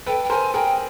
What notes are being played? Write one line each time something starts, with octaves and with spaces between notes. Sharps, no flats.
A4 B4 G5
G5
A#4 C5 G#5
G#4 A#4 G5